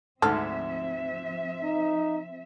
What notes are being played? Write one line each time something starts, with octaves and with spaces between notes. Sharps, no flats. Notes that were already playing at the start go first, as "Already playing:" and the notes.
D2 G#2 F3 C4 A4 E5 F6
D#4